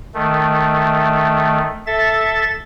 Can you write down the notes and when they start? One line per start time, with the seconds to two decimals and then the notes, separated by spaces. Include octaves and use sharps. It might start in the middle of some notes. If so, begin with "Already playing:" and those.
0.14 D#3 A3
1.86 A4 E5 A6